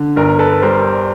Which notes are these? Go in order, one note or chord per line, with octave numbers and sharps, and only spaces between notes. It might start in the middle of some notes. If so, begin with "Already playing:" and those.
Already playing: D3
G1 A#4
A4 B4
G3 A#4 C5